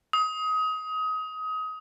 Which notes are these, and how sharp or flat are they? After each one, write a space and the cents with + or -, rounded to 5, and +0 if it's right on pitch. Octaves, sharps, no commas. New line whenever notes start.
D#6 +25